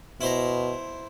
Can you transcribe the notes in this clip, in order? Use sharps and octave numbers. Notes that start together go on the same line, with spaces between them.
B2 E4 C5 A#5